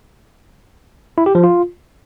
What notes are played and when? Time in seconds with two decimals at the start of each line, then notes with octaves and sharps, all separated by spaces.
1.18 E4
1.26 G4
1.35 F3
1.44 F4